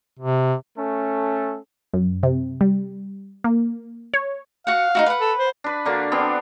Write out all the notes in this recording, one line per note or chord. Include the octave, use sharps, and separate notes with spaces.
C3
A3 C#4 A4
F#2
C3
G3
A#3
C#5
F#4 F5 F#5
D#4 E4 F#4
B4 F#5
A4
C5
D4 B4
D3 A#3 D4 F#4
B3 C4 D4 A4